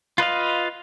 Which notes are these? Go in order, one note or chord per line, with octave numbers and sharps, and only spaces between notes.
F4 B4 D#5 F5